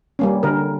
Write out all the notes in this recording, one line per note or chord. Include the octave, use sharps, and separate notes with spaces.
G3 A#3 C#4
D3 A#4